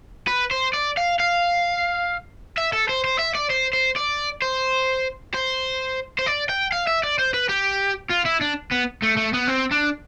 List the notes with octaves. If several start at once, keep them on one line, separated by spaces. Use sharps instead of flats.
B4
C5
D5
F5
F5
E5
A4
C5
C5
E5
D5
C5
C5
D5
C5
C5
C5
D5
G5
F5
E5
D5
C5
B4
G4
F4
E4
D4
B3
A3
A3
B3
C4
D4